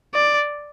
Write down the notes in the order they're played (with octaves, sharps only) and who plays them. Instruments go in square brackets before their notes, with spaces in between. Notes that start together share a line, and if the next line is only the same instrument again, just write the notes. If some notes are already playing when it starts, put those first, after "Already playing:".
[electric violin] D5